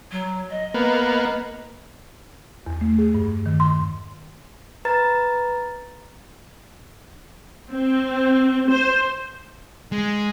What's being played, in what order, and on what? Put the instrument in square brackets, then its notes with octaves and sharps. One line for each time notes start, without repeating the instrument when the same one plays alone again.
[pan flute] F#3
D#5
[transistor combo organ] A#3 B3
[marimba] E2
A3
G#4
G2
D#3
C6
[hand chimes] B4 A#5 A6
[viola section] C4
C5
[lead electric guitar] G#3